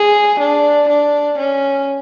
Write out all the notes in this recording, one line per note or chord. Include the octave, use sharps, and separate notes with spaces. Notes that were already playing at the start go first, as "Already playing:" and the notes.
Already playing: G#4
D4
D4
C#4